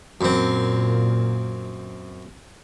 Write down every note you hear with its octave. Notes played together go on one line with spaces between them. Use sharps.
F#2 A#2 C4